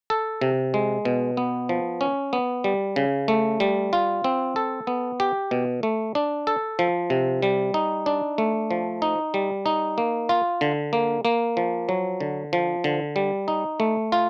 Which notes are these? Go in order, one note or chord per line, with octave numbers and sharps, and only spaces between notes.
A4
C3
G#3
B2
B3
F3
C#4
B3
G3
C#3
A3
G3
F4
C4
A4
B3
G4
B2
A3
D4
A4
F3
C3
G3
D#4
D4
A3
F3
D#4
G3
D#4
A#3
F4
D3
A#3
A#3
F3
F#3
D3
F3
D3
G3
D#4
A3
F4